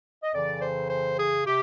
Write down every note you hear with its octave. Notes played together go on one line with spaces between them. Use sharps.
D#5
F2 C#3 E3 D5
C5
C5
G#4
C3 G4